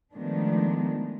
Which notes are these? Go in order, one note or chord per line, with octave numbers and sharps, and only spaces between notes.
D#3 F3 G#3 A3 B3 D4